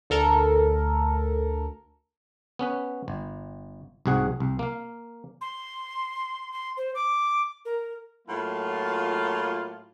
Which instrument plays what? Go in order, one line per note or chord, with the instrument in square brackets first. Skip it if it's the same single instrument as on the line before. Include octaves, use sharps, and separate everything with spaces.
[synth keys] D2 A4 A#4
[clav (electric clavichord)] B3 C#4 B4
G1
C2 G#2 F#4 G#4 F#5
C2
A#3 F5
[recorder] C6
C6
C5
D6
A#4
[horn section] A2 F#3 A#3 F4